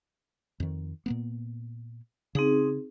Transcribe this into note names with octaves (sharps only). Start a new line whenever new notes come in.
F2 D#3
A#2 A#3 B3
C#3 C4 D#4 G#4